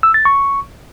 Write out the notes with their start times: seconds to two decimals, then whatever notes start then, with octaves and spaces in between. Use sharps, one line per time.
0.03 E6
0.14 A6
0.25 C#6